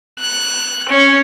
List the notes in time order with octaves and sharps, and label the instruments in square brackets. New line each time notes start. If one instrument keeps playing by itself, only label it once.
[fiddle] F#6
C#4